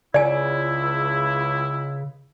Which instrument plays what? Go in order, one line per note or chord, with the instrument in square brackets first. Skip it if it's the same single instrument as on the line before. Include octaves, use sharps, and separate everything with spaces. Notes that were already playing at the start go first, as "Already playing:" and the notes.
[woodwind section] C#2 E4 [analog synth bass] C#3 [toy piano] D5 G#5